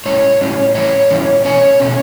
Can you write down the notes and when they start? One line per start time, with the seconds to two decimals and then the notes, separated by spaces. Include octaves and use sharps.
0.06 A2 G3 C#4 C#5
0.41 A2 G3 C#4
0.75 A2 E3 G3 C#4 C#5
1.10 A2 E3 G3 C#4
1.45 B2 A3 C#4 C#5
1.80 B2 A3 C#4